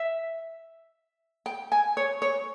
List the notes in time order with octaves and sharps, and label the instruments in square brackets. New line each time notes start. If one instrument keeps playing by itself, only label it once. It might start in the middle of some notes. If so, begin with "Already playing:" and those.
Already playing: [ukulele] E5
G5
G#5
C#5
C#5